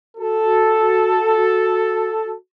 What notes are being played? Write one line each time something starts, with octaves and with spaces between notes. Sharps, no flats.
F#4 A4